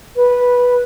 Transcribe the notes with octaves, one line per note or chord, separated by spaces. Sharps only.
B4